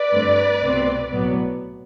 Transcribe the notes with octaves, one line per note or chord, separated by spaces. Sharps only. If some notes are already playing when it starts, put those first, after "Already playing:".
Already playing: B4 D5
G2 D3 A3 C4
C2 B2 A3 C4
B1 A2 F#3 B3